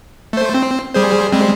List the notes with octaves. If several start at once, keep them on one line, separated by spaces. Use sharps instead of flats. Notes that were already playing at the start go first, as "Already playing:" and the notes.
A3 C5
C4
G3 G#4 C5
G3 G#3 C4